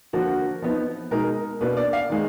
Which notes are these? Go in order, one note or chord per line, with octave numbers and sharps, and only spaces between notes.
D3 F3 A#3 F#4
F3 B3 D#4
B2 G#3 D#4 A#4
B2 A#3 D4 B4
D5
F5
D#3 G#3